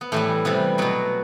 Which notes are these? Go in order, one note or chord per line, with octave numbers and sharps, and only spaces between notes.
B3
A2 E3 G3 A3
C3 E3 G3 B3
B2 F#3 B3